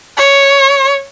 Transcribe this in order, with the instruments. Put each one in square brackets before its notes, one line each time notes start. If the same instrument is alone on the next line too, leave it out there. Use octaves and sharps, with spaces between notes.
[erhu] C#5